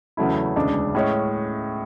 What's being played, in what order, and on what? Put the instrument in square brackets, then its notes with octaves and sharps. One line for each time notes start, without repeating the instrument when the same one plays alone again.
[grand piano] E2 C#3 F#3 A3 E4
E1 D2 C#3 G#3 D4
A2 G#3 C#4